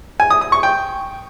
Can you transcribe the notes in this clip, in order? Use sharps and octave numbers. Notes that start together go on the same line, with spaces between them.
G#5
D#6
D#6
C#6
G5